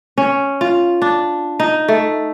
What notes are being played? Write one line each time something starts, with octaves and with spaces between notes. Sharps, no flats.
C#4
F4
D4
D#4
A3